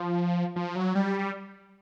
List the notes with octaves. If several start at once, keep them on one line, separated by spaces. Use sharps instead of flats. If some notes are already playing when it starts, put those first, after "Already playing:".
Already playing: F3
F3
F#3
G3